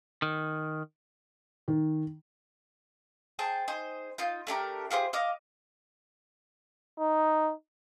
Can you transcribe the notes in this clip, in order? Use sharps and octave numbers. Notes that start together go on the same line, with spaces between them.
D#3
D#3
G#4 C5 G5 A5
D#4 G#4 C5
D#4 F4 G6
A3 D4 G4 A#4
F4 G4 G#4 C5
D#5 F5 D6
D#4